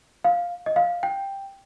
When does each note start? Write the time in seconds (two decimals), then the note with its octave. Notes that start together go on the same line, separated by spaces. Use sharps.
0.24 F5
0.66 D#5
0.76 F5
1.03 G5